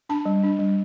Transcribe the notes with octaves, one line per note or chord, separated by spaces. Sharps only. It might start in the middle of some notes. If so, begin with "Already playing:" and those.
D4 A5
G3
D4
G3